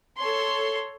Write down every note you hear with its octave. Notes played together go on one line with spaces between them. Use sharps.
A4 C#5 C6